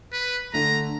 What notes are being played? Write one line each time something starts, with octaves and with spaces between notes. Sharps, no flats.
B4
D3 A3 A#5